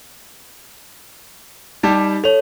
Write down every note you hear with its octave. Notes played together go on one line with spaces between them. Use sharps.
G3 D#4 G4 A5
A4 C#5 F7